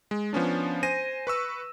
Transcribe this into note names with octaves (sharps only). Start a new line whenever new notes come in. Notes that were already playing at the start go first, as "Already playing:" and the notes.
G#3
F3 B3 C#4 D4
C5 G#5 A#6 D#7
B4 C#6 E6